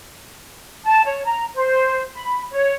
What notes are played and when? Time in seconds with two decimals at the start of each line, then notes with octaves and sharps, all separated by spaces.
0.85 A5
1.06 C#5
1.26 A#5
1.56 C5
2.14 B5
2.52 C#5